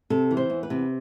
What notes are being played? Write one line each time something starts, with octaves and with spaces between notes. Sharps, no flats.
C3 A4
E3
C5
E2
B4
C3